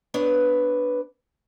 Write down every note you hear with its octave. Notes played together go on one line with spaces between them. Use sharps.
B3 D4 B4 C#5